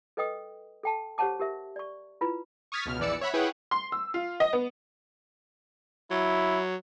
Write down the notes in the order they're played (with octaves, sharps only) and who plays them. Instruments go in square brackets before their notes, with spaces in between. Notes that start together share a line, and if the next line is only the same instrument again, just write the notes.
[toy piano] A4 B4 D#5 G5 D#6
A4 G5 A5
G4 C5 C#5 F#5 A5 D6
G4 A#4 E5
D5 C#6
E4 F4 B4 B5
[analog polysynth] C#6 D#6 F6 G#6 A6 B6
C#2 B2 F6
A#1 E2 E3 D5 E6 C#7
C#5 E5 F#5 B5
E4 G#4 B4 C#5 F#5 G5
[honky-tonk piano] C6
E6
F4
D#5
B3
[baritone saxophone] F#3 [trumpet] E4